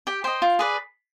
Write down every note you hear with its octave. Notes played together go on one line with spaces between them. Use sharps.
G4 G5
C5 D#5 G5
F4
G#4 B4 D5